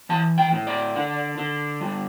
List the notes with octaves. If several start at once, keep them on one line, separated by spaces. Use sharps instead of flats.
E3 A5
G5
A2
D5
D3
D3
G3